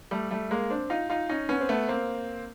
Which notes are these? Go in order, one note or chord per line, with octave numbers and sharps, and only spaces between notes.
G3 A3
G3 A3
G#3 A#3
C4 D4
D#4 F4
D#4 F4
C#4 D#4
B3 C#4
C4
A3 B3
A#3 C4